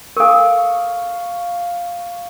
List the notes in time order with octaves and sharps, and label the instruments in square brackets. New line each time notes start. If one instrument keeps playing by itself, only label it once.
[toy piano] A4 A#4 [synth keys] F5 C#6